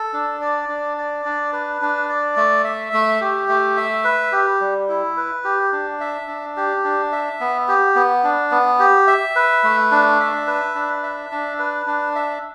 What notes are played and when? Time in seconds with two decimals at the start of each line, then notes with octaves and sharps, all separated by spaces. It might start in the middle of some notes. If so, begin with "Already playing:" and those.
Already playing: A4
0.13 D4
0.41 D5
0.69 D4
0.98 D5
1.25 D4
1.52 B4
1.82 D4
2.09 D5
2.36 A3
2.64 E5
2.93 A3
3.21 G4
3.48 A3
3.77 E5
4.04 B4
4.32 G4
4.61 G3
4.89 E4
5.17 B4
5.44 G4
5.72 D4
6.00 E5
6.28 D4
6.57 G4
6.84 D4
7.12 E5
7.40 B3
7.68 G4
7.96 B3
8.24 D4
8.51 B3
8.79 G4
9.07 E5
9.36 B4
9.64 A3
9.91 D4
10.20 E5
10.47 B4
10.75 D4
11.03 E5
11.32 D4
11.59 B4
11.87 D4
12.15 E5